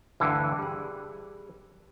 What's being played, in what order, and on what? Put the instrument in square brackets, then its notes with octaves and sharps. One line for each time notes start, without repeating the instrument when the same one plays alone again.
[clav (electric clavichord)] D2 G2 D3 E3
G3 G#4